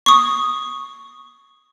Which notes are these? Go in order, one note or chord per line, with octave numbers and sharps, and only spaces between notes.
C#6 D#6